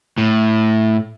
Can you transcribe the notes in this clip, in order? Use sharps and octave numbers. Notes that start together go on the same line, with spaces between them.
A2